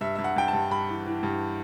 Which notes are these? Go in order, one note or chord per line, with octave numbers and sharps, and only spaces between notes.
G2 E5
G2 E5
F#5
G2 G5
A5
G2
G2 B5
E3
E3
G2